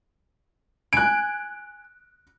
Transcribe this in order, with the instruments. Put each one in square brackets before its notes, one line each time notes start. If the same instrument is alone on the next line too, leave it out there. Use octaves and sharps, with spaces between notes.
[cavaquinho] G#5 [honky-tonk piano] F#6 D7